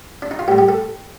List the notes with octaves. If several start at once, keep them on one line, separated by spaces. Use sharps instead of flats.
D4
D#4
F4
A2 G3 G4
G4
A4